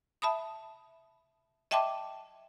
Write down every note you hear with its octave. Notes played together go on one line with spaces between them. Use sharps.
E5 A5 B5 D#6
D#5 E5 G5 A5 C6 D6